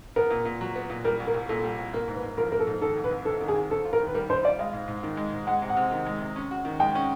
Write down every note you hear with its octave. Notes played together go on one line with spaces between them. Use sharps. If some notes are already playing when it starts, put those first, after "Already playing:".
B3 A#4
A#2
A#2
F#3
B3
A#2
G3 A#4
C2
A#4
C2
A#2 A4
G3
C2
A#3 A#4
G#2
B4
G#2
F3 A#4
A#3 A#4
A4
G#2
D#3 A4
C2
B4
C2
C3 A4
D#3
G#4
C2
C4 A4
F4
A#4
D#3
B4
G3 A#4
C4 C5
F4 D5
G#3 F5
G#2
G#2
D#3
G#3
G#2
G#3 F#5
C3
F#5
C3
D#3
G#3
C3
C#4
F#4
D#3
G#3 G5
C#4